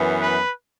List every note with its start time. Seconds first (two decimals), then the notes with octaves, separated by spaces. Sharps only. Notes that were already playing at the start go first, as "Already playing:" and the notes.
Already playing: F#2 E3 B3
0.21 B4